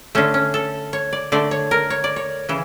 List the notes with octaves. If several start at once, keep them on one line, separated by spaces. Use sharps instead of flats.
D3 A3 C#4
C#4
A4
C#5
D5
D3 A3 D5
C#5
A#4
C#5
D5
C#5
C#3 E3